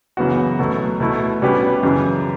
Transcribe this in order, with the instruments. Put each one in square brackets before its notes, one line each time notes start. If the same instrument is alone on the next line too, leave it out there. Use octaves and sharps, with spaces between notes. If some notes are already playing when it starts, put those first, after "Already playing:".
[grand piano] F#2 C#3 E3 B3 F#4
B2 F#3 A3
B2 A3 E4
B2 G3 C#4 G4 B4
F#2 C#3 E3